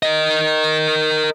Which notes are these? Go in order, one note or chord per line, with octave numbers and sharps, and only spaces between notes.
A#4 D#5